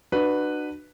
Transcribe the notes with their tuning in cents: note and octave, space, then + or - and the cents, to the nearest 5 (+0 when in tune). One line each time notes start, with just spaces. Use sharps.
D4 +35 F#4 +0 B4 +0